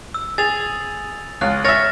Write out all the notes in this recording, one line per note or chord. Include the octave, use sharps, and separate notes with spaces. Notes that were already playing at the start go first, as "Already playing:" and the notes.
E6
G#4 A6 F7
C#2 F5 F#6
C#5 E5 F6 A6 A#6